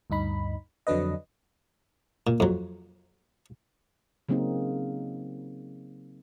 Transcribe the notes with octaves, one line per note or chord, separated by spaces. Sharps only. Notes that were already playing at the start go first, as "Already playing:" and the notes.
D2 G2 D#4 B5
F2 D3 F#3 D4 B4 D#5
A#2
F2 F#3
C#3 F#3 A#3 C4 D#4